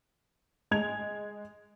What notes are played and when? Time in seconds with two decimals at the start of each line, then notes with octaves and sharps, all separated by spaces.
0.71 G#3 G#6 F7